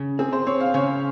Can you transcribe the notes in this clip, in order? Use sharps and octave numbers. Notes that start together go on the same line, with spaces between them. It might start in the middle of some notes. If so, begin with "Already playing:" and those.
Already playing: C#3
C4 G#4
C5
C4 C#5
F5
C#3 C#5